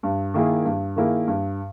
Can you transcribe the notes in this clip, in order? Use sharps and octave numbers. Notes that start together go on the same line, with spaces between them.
G2
D#3 A#3 E4 G#4
G2
D#3 A#3 E4 G#4
G2